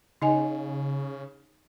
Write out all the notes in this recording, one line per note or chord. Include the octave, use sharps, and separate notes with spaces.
C#3 D#4 D#5 G#5